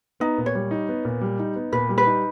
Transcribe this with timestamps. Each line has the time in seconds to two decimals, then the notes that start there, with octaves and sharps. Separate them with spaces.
0.20 B3 D#4
0.38 A#2
0.46 C#5
0.55 G3
0.71 D#4
0.89 B3
1.05 A#2
1.21 G3
1.39 D#4
1.56 B3
1.72 A#2 B4
1.89 G3
1.98 B4
2.06 D#4